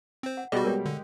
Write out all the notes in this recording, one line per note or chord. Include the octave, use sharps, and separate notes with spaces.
C4 C5
F#5
B2 G3 F4 F#4 G#4 D#5
G#3 G4 A#4 C#5 G5
D3